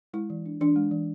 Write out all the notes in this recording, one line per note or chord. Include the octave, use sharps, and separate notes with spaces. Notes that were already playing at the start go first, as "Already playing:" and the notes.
G#3 E4
E3
D4
E3 D4
G#3
E3